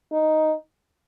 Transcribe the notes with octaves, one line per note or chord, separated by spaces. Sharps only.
D#4